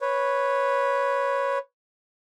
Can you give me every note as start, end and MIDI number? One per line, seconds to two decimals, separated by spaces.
0.01 1.58 71
0.01 1.58 73